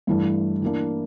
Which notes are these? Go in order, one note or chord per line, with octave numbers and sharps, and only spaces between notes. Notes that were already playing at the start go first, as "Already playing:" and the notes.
G2 E3 A3 D4
E3 A#3 D4